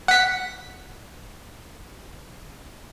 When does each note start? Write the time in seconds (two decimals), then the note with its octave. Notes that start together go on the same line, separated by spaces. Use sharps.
0.08 F#5 B6